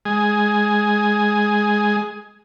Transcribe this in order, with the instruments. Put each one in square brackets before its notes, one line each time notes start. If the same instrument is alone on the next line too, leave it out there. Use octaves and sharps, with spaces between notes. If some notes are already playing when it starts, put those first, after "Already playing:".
[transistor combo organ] G#3 G#5